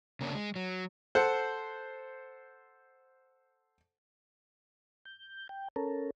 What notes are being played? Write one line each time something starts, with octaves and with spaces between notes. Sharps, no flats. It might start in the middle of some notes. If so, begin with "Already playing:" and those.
C#3 A#3 C#4 D4
G#3
F#3
A4 C5 F#5
G6
G5
C#4 A4 A#4